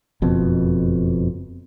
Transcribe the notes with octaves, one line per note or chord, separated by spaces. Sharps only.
F#1 F2 B2